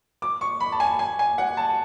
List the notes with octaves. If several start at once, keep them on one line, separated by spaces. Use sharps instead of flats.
D6
C#6
B5
A5
G#5
G#5
G#5
F#5
A5